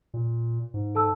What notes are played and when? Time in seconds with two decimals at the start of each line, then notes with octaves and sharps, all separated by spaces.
0.14 A#2
0.74 G#2
0.95 A4 A5 E6